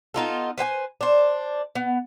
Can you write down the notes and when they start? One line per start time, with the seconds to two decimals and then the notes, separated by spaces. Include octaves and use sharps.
0.14 B3 D#4 F4 A4
0.58 B4 C5 G5 G#5
1.01 D4 C5
1.75 B3